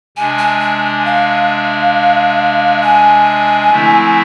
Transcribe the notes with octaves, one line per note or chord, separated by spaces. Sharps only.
C3 G#3 D4 G#5
G#5
G#5
F5
G#5
D3 F3 A3 C4 E4